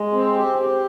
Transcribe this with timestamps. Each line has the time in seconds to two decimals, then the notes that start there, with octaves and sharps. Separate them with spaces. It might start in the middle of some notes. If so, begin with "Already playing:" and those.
Already playing: G#3
0.13 C4
0.35 G4
0.59 G4